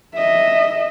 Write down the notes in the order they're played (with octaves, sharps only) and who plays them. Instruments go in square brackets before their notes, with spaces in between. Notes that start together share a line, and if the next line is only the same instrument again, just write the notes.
[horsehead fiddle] D#5 E5